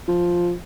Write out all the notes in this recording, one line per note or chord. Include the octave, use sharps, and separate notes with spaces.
F3